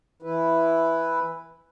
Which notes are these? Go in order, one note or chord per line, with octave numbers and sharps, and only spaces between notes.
E3 E4 B4